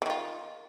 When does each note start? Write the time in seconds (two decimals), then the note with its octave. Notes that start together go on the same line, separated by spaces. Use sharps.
0.02 E3
0.06 D#3
0.10 F4